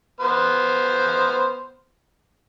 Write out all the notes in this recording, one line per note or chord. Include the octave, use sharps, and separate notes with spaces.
B3 C5 F6